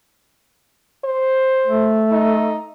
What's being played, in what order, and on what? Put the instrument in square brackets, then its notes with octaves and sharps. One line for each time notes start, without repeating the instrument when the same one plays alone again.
[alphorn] C5
[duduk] A3
[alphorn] D#4